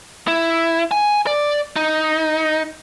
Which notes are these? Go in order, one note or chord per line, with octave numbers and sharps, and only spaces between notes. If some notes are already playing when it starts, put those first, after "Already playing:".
E4
G#5
D5
D#4